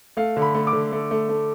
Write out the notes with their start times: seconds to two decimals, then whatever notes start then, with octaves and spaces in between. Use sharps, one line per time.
0.17 A3 F5
0.37 D3
0.42 B5
0.55 A3
0.67 D6
0.73 D3
0.92 A3
1.11 A3
1.29 A3